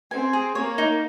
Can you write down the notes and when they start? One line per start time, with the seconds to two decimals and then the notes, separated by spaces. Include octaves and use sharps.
0.11 C4 G#5
0.33 G#4
0.55 A#3 C#5
0.78 D#4